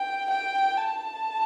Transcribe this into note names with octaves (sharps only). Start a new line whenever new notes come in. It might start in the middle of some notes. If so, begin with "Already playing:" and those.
Already playing: G5
G5
A5